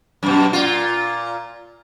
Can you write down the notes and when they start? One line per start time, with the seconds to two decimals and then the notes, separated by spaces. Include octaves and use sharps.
0.23 F#2 B2
0.53 A#2 F4